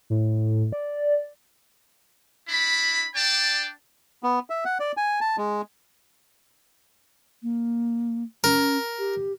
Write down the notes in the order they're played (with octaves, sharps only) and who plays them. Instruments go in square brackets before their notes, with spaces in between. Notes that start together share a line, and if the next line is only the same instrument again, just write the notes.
[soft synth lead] A2
D5
[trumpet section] D4 E4 B5
D4 D5 G5 A5
[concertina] B3
E5
F#5
D5
G#5
A5
G#3
[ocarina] A#3
[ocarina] C#4 [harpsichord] A#4
[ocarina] G4